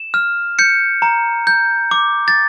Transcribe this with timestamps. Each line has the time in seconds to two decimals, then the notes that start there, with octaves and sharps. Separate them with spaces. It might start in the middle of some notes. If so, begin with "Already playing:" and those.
Already playing: E7
0.14 F6
0.59 G6 C#7
1.02 A#5
1.47 G6
1.91 D6
2.28 A6